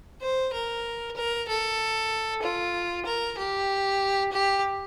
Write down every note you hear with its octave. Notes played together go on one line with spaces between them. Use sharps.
C5
A#4
A#4
A4
F4
A#4
G4
G4